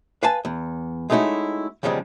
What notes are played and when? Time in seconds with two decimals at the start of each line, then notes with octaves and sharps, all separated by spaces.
0.23 B4 F5 G#5 A5
0.45 E2
1.10 G#3 A3 C#4 D#4 E4 F#4
1.83 E2 C#3 F3 G3 G#3